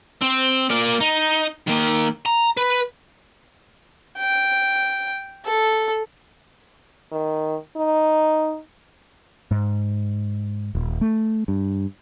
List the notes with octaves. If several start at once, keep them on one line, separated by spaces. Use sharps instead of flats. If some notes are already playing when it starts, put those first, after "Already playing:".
C4
A#3 D5
D#4
D#3 A#3
A#5
B4
G5
A4
D#3
D#4
G#2
D#1
A3
G2